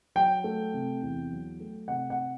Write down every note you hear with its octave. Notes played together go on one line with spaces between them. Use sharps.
F#3 G5
A3
C3
E2
F#3
A3
C3 F#5
F#5